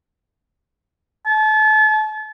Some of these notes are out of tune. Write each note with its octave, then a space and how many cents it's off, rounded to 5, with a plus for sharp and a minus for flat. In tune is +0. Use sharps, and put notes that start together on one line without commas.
A5 -35